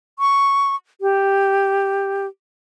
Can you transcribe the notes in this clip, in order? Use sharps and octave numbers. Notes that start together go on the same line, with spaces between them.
C#6
G4